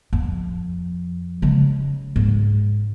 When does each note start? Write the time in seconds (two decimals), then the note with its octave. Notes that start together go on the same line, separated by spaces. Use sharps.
0.13 F2
1.42 C#3 G#3
2.16 G#2